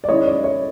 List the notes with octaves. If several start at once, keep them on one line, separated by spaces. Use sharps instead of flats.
D5
D#3 G#3 C#4 E4 C#5 D#5
D5
C#5